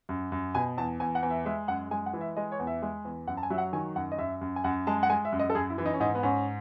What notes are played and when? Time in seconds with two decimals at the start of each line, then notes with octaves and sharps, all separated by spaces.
0.09 F#2
0.32 F#2
0.55 B2 G#5
0.78 E2 A5
1.00 E2 G#5
1.15 F#5
1.23 E2
1.30 E5
1.46 G#3 E5
1.68 F#2 F#5
1.91 G#3 G#5
2.06 F#5
2.14 E3
2.21 E5
2.37 G#3 D#5
2.52 C#5
2.59 E2
2.67 E5
2.82 G#3
3.05 E2
3.27 F#2 F#5
3.37 A5
3.43 G#5
3.50 F#3 E5
3.58 F#5
3.73 D#3 G#5
3.96 F#2 F#5
4.12 D#5
4.18 F#2 E5
4.41 F#2
4.56 G#5
4.64 F#2 F#5
4.87 G#3 A5
5.03 F#5
5.10 G#3 G#5
5.25 E5
5.32 F#2
5.39 D#5
5.50 A4
5.55 F#2 G#4
5.70 E4
5.78 E3
5.86 D#4
5.93 C#4
6.00 G#2 D#4
6.15 B3
6.23 G#2 C#4